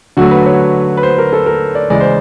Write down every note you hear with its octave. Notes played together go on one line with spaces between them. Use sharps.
D3 F#3 A3 F#4
B4
C#5
B4
C5
A#4
A4
A#4
D5
C#3 E3 G#3 D5
C5